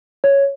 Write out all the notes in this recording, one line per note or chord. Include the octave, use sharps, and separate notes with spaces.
C#5